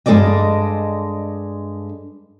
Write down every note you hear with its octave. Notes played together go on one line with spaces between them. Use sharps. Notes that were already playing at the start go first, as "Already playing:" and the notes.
G2 G#3 D#4 A4 D5 D#5